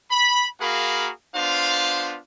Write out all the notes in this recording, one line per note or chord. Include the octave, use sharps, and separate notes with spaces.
B5
A#3 F#4 G#4 A#4 F5 B5
B3 D4 F4 C5 F5